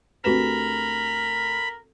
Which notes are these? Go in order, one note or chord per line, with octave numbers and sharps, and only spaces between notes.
D2 C4 F#4 G4 A#4 B4 B5 E7